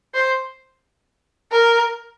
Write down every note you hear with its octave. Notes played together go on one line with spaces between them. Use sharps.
C5
A#4